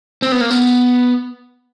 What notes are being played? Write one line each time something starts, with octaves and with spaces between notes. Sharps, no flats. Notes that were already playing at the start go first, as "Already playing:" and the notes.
C4
B3
A#3
B3